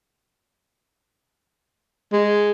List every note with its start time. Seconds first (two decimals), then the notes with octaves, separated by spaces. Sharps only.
2.12 G#3